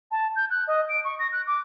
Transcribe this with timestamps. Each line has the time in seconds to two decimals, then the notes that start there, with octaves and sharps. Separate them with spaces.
0.11 A5
0.36 G6
0.50 F#6
0.68 D#5
0.89 D7
1.05 C#6
1.19 A#6
1.32 F#6
1.47 D6